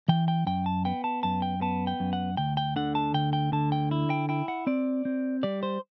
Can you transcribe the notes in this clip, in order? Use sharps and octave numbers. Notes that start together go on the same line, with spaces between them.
E3 G5
G5
F#2 G5
A5
B3 G5
A5
F#2 A5
G5
B3 A5
G5
F#2
F#5
D2 G5
G5
D3 F#5
A5
D2 G5
G5
D3 A5
G5
E4
G5
E4 G5
F#5
C4 D5
C4
G3 D5
C5